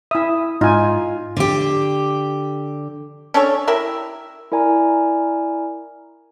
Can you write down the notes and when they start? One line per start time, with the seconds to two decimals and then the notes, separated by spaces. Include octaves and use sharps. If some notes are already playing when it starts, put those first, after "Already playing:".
0.11 E4 E5 D#6
0.61 G#2 D#4 F4 G#5
1.37 D3 G4
3.34 C#4 D4 A4 C#5
3.68 E4 G4 A#4 E5
4.52 E4 A#4 D5 G#5 A#5